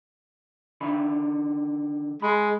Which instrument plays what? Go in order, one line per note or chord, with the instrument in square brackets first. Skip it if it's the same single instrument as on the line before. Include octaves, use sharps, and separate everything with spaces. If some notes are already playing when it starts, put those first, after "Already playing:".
[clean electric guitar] D3 D#3 B5
[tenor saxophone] G#3 [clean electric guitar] B5